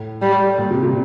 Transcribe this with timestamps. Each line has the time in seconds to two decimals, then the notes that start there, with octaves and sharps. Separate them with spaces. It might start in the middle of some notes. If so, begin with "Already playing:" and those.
Already playing: A2
0.22 G3
0.58 A#2
0.71 C3
0.83 C3